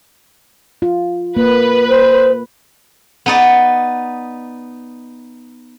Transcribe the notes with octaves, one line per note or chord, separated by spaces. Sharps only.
F4
A#3 B4
C5
B3 D#4 D5